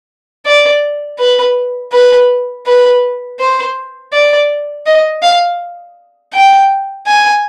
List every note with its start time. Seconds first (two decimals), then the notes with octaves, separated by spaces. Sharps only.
0.46 D5
1.19 B4
1.93 B4
2.66 B4
3.39 C5
4.13 D5
4.86 D#5
5.22 F5
6.33 G5
7.07 G#5